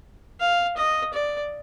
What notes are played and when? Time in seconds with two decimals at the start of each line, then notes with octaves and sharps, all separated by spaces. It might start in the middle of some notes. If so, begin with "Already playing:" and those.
0.40 F5
0.77 D#5
1.14 D5